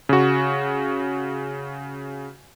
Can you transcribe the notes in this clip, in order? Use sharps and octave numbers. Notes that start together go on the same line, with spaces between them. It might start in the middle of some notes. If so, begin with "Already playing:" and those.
C#3 F#4